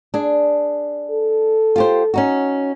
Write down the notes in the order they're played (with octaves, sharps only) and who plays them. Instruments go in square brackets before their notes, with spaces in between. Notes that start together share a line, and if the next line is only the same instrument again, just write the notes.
[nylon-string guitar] D4 G#4
[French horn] A4
[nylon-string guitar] F4 G4 C5
C#4 D#4 F#4